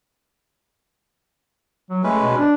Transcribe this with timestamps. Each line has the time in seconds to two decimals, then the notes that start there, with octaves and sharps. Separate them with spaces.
1.90 F#3
2.04 G#3 A3 C#4 B4
2.21 B2
2.36 D4